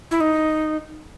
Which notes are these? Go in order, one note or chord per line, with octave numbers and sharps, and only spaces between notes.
E4
D#4